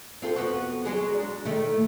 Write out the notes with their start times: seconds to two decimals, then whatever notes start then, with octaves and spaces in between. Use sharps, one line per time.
0.22 C4 F4 A4
0.36 F2 B3 F#4
0.85 F#3 G#3 G#4
1.13 D4
1.45 A2 D#3 A3